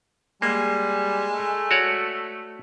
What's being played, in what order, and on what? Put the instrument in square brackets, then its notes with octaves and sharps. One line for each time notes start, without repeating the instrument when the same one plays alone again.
[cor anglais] G3 [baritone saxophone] G#3 [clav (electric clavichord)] A#3
[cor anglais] A3
[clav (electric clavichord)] F#4 C#5 D5